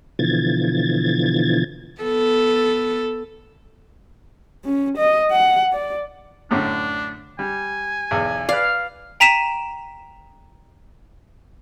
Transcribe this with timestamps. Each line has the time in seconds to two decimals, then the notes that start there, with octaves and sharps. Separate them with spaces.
0.19 B2 D3 E3 F3 G#6 A6
2.02 B3 A4
4.65 C#4
4.98 D#5
5.31 F#5
5.73 D5
6.51 F#2 A2 D3 D4
7.39 G3 G#5
8.11 B1 E2
8.49 B4 D5 F5
9.20 G5 A#5 B6 D#7 E7